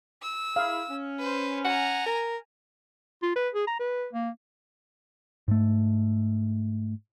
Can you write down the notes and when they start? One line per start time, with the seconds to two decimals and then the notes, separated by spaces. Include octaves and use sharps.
0.22 E6
0.56 E4 G#4 F5
0.89 C#4
1.19 B4 C5
1.65 F#5 G#5 A#5
2.06 A#4
3.22 F4
3.36 B4
3.54 G#4
3.67 A#5
3.80 B4
4.13 A#3
5.48 G#2 A3